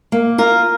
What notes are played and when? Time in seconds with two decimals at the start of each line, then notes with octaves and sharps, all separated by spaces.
0.12 A#3
0.38 F4 A#4